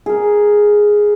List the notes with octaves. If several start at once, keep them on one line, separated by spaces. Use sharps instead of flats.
G#4 A#4